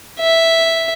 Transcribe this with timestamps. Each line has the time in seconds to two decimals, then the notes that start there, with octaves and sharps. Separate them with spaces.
0.20 E5